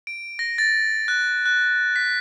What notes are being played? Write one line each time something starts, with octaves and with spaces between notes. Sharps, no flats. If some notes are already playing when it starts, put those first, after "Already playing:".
D7
A#6
A6
F#6
F#6
B6